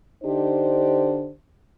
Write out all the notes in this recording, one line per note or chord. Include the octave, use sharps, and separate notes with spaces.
D3 D4 D#4 G4 C5